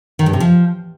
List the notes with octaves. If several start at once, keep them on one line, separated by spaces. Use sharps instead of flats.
D#3
G2
C3
F3